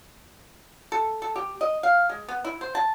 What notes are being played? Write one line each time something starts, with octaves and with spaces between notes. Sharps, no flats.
A4
A4
G4
D#5
F5
G#3
B3
E4
C5
A5